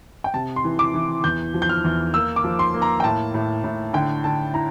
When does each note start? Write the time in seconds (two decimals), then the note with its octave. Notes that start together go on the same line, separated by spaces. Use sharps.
0.24 G5
0.34 C3 A5
0.56 C6
0.64 E3
0.79 D6
0.94 E3
1.24 E2 G6
1.54 F3
1.62 G6
1.69 F6
1.84 E2
2.14 A#3 E6
2.36 D6
2.44 F3
2.59 C6
2.74 A#3
2.82 A#5
3.00 G5
3.04 A2 A5
3.34 A2
3.64 A2
3.93 D3 G5
4.24 D3 A5
4.54 E4 A#5